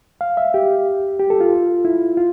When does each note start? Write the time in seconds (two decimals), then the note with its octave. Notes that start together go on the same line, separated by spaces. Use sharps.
0.21 F5
0.37 E5
0.54 G4
1.19 G4
1.30 A4
1.41 F4
1.85 E4
2.17 F4